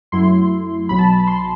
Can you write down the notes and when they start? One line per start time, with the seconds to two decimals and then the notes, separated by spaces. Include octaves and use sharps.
0.12 F#2 F#3 A3 E4 C6
0.89 B1 B2 F#3 B5
0.99 A5
1.18 B5
1.27 C6